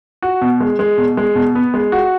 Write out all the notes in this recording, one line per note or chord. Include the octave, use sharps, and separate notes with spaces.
F#4
B2
G#3
G#3
B2
G#3
B2
B3
G#3
F#4